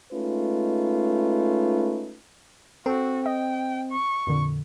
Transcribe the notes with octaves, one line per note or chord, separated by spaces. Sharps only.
G#3 A3 C#4 D#4 F4 B4
C4 F#4 A4
D#5 G5
C#6
F2 A#2 D3